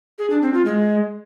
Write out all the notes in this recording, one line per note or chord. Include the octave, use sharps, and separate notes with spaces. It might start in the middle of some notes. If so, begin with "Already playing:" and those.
G#4
D4
C4
F4
G#3